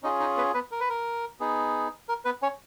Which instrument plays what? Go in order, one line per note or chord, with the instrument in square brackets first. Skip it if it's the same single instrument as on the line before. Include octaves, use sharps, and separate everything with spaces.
[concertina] C#4 D#4 F4 G#4 D#5
D#4 D#5
B3 B4
B3 B4
A#4
B4
A#4
B3 D#4 G#4
A#4
B3 B4
C#4 C#5